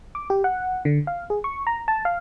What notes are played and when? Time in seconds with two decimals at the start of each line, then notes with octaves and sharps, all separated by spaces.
0.15 D6
0.30 G4
0.44 F#5
0.85 D3
1.07 F5
1.30 G#4
1.44 C#6
1.67 A#5
1.88 A5
2.05 F5